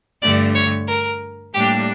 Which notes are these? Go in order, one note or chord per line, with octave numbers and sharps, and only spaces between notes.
G2 D3 A3 D5
C#5
A#4
A2 G3 A#3 D4 G4